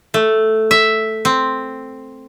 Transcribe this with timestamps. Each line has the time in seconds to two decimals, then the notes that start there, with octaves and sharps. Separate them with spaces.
0.14 A3
0.71 E5
1.25 C4